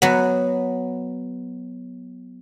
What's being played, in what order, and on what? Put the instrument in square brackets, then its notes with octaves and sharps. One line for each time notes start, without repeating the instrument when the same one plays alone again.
[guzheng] F#3 B3